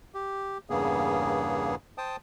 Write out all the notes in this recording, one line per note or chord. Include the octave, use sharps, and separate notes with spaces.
G4
E2 G2 C#3 A#3 B3 G#4
C5 G5 A5 D#6